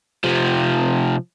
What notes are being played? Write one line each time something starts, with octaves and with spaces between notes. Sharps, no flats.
C3 F3